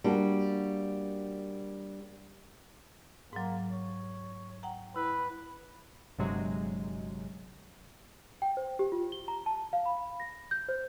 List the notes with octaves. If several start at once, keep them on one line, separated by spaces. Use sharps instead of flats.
G3 A#3 D4 F#4
G#2 F#3 A#3
C#5
F#5 G5 A#5
E4 B4
G1 G2 C3 F#3 G#3
G5
C5
G4
F4
G7
A#5
A5
F5
B5
A#6
G6
C5